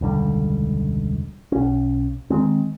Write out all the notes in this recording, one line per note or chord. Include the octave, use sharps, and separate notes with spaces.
E1 C#2 D3 G3
B1 C#4
D#3 E3 G#3 C4